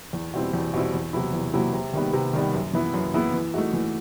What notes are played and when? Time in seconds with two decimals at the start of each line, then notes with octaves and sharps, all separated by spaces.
0.13 E2
0.34 B2 G3 C4 E4
0.53 E2
0.73 B2 G3 C4 E4
0.94 E2
1.13 C3 F#3 B3 E4
1.33 E2
1.54 C3 F#3 B3 E4
1.73 C3
1.93 D#3 G3 B3
2.13 C3
2.33 D#3 G3 B3
2.53 F#2
2.73 E3 B3 E4
2.94 F#2
3.14 E3 B3 E4
3.34 E3
3.54 A3 D#4 F#4
3.73 E3